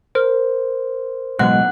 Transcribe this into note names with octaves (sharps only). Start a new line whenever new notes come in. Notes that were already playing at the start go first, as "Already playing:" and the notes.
A#4 C5
A1 B2 F#3 G#3 F#5 F#6